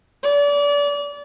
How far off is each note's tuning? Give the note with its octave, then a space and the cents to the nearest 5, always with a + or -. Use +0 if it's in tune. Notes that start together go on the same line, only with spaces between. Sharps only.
D5 -30